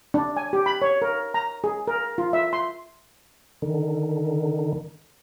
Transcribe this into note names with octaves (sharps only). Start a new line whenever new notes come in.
D4
G#5
G4
B5
C#5
A#4
A#5
G#4
A#4
F4
E5
C6
D3 D#3